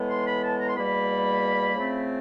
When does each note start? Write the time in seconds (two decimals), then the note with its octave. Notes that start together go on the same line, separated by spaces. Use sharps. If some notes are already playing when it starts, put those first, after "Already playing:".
Already playing: A2 E3 G#3 B3
0.09 C6
0.26 B5
0.43 A5
0.59 A#5
0.69 C6
0.75 E2 B2 G3 A#3 B5
1.74 C#3 F3 A3 C4